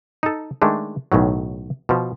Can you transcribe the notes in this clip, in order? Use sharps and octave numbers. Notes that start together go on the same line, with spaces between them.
D#4 A4
D#3 G#3 A3 D4
B1 A2 D#3 F#3
B2 F3